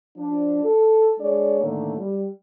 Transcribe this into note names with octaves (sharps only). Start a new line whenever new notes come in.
F3 D4
A4
G#3 D4 G#4 C#5 D5
A2 D3 D#3 A3 A#3
G3